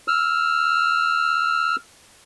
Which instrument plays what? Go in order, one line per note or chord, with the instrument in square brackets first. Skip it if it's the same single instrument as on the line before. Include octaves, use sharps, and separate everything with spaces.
[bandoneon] E6 F6